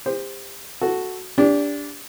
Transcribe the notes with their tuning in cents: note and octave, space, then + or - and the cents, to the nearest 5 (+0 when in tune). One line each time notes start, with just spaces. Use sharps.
G4 +35 C5 +0
F#4 +0 A4 +0
D4 -20 G4 +20